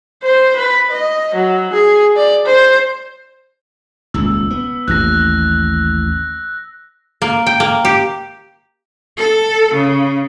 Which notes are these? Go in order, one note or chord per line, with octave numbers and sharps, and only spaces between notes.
C5
B4
D#5
F#3
G#4
D5
C5
D#1 C#2 E6
B3
A1 D#2 F#6 A#6
A#3
G5
A#3
G4
A4
C#3